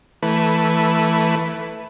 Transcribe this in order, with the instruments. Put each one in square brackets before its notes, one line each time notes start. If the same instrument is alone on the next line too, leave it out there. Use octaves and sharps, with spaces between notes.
[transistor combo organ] E3 A3 B4